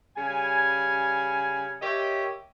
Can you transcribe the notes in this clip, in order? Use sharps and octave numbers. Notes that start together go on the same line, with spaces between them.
C#3 G3 G#5
G4 A#4 C#5 D#5 E5